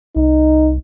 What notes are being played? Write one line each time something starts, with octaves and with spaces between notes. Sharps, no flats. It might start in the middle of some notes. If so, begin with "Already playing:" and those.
C2 D#4